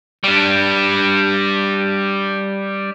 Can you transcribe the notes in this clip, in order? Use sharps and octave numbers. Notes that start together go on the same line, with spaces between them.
G3 D4